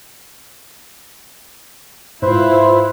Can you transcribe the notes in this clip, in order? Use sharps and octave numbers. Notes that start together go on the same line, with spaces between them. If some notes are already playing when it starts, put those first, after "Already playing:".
G#2 E4 F4 B4 C5 E5